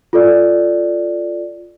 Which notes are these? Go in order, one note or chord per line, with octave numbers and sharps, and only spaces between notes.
F4 A4 D5